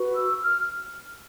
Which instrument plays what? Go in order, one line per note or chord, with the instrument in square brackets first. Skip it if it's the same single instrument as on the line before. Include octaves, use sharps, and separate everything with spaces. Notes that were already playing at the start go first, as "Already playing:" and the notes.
Already playing: [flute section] F#4 B4
E6
F6